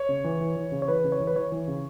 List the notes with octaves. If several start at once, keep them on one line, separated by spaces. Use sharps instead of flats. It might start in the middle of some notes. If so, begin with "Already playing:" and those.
Already playing: C#5
C#3
E3
E3
E3
C#3
C#5
E3 B4
C#3
C#5
E3
B4
E3 C#5
E3
C#3